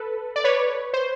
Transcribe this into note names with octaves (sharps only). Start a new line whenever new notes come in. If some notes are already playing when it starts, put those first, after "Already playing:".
Already playing: A4 B4
D5
B4 C#5
C5